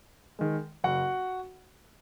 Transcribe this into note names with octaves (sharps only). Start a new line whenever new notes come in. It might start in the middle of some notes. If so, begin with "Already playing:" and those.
D#3 G#3
F#1 F#4 F#5